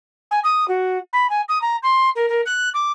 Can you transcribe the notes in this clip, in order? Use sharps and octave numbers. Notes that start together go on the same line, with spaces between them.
G#5
D#6
F#4
B5
G#5
D#6
A#5
C6
A#4
A#4
F#6
D6